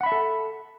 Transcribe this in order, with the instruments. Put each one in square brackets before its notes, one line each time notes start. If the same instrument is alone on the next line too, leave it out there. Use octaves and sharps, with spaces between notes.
[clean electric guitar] F#5
B5
E5
A5
A4